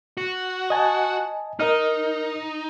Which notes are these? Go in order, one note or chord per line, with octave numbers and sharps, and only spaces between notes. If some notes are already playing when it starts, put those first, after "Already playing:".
F#4
D#5 G#5 A5
D#4 A#4 D#5 F6